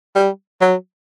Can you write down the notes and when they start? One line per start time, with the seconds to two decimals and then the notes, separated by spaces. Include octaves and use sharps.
0.15 G3
0.61 F#3